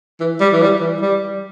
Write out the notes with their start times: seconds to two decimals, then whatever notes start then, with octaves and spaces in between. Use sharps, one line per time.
0.20 E3
0.41 G3
0.53 E3
0.62 G3
0.81 E3
1.02 G3